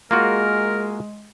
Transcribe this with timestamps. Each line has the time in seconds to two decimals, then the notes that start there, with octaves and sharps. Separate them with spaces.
0.11 G#3 A#3 F4 F#4 A#4